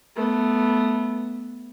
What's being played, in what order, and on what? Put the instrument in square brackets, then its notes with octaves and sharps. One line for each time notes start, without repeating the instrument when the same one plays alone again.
[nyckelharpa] A3 B3